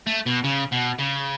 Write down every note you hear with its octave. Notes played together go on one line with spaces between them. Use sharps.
A3
B2
C#3
B2
C#3